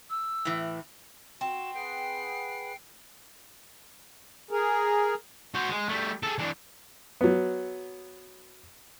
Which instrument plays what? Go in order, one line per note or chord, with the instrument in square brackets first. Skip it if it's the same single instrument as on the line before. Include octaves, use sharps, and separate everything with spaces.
[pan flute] E6
[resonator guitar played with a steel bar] A2 E3
[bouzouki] C4 [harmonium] F#4 [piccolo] E7
[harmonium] G#4 B4 F#5 [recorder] G5 [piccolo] C7
[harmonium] G#4 A#4
[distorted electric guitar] F#4 C5
G#3
G3 A3
G#4 A4
E3 D4
[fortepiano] F#3 B3